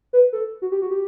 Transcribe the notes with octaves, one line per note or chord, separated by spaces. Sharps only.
B4
A4
F#4
G4
F#4
G4